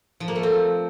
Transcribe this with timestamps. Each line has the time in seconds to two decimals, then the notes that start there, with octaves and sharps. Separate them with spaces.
0.20 F3
0.28 A#3
0.36 A3
0.43 C4